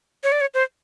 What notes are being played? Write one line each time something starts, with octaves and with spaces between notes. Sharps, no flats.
C#5
D5
C#5
C5